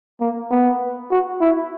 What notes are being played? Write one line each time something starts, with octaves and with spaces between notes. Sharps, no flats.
A#3
B3
F#4
E4